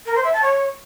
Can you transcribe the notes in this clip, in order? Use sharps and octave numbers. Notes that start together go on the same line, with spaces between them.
A#4
C5
E5
A5
C#5